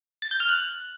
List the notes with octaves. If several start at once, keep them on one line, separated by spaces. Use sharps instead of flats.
A6
G6
F6
F#6